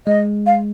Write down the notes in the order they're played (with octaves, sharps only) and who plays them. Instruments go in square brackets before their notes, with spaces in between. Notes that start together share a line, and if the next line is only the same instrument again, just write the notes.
[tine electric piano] G#3 [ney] D#5
[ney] F5